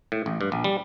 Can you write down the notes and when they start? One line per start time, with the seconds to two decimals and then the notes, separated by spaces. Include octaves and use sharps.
0.12 A2
0.26 A1
0.41 G2
0.52 A#1
0.64 G3